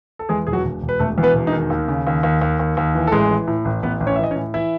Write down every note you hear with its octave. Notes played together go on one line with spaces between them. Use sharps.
A4
E2 G#3 G#4
E1 G#4
F#3 F#4
E1
E1
B4
E1 A3 A4
E2
B3 B4
E1
D#4
D#3
D#2
C#3
D#2
D#2
D#2
D#2
D#2
E3
A4
A1 G#3 G#4
E3
A2
A1
A1 B3 B4
A1
C#4 C#5
E5
E3 D#5
C#4 C#5
A2
E3 E4 E5